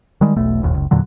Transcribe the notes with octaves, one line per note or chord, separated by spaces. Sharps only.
D#3 G3 G#3
E1 B1 A3
E1 A#1 D#2
F#1 C#2
E2 A#2 D3 F#3